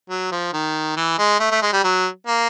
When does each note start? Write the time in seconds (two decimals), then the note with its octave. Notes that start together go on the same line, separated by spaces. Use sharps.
0.10 F#3
0.32 F3
0.53 D#3
0.97 E3
1.19 G#3
1.40 A3
1.51 A3
1.62 G#3
1.73 G3
1.84 F#3
2.27 A#3